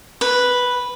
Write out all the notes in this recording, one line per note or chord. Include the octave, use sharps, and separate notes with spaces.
B4